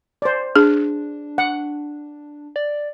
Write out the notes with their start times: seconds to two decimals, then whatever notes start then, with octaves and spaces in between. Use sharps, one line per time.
0.22 C5 D5
0.56 D4 G#4
1.38 F#5
2.56 D5